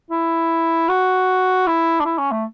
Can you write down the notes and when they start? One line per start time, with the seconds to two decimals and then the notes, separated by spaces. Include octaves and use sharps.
0.11 E4
0.89 F#4
1.67 E4
2.00 D4
2.05 E4
2.18 C#4
2.31 A3